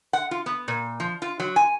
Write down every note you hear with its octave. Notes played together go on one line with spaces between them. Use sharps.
F#5
F4
B3
A#2
F3
F4
F#3
G#5